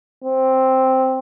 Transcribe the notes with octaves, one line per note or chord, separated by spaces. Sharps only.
C4